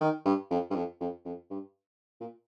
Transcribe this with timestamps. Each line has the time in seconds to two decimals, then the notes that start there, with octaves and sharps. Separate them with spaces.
0.01 D#3
0.25 G2
0.51 F2
0.71 G2
0.75 F2
1.01 F2
1.25 F2
1.50 G2
2.21 A#2